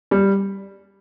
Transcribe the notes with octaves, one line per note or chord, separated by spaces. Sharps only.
G3